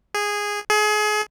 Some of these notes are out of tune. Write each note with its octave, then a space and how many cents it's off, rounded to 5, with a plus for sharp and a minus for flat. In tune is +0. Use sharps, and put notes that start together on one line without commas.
G#4 -10
G#4 +30